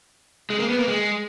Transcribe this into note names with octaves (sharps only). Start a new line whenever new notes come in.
G#3
A#3
B3
A#3
G#3